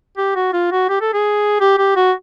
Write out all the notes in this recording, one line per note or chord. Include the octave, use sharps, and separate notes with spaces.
G4
F#4
F4
F#4
G4
A4
G#4
G4
G4
F#4